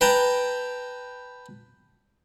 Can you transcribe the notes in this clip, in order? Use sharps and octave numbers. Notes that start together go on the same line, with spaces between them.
B4 G5 A5 A#5